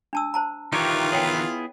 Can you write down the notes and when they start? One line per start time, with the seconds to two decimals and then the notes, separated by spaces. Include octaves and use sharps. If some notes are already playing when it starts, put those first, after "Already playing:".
0.13 D4 A5 E6
0.34 C5 A5 A#5
0.73 D#3 E3 D#4 F4 G4 C#5
1.12 B3 E4 G#4 C#5 G5 G#5